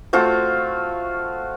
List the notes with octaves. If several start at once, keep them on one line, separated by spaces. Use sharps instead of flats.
A3 C4 F4 F#4